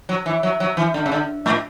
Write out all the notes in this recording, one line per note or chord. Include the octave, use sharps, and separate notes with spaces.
F#3
E3
F#3
F#3
E3
D3
C#3
D3
A2